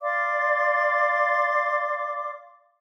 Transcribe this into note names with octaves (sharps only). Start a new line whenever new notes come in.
D5 F5 C6 D6